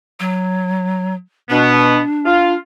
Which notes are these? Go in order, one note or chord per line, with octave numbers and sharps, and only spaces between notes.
F#3
B2 B3 D4
F4 F5